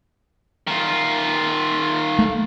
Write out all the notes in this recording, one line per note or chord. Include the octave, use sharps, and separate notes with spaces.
D#3 F4
A3